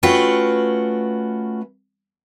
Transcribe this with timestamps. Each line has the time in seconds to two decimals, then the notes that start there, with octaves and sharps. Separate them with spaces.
0.03 A3 C#4 F4 F#4 B4 G5